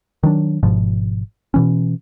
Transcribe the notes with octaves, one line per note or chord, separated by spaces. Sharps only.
D#3 F#3 D4
G#1 G#2 B2 F3
B2 E3 C#4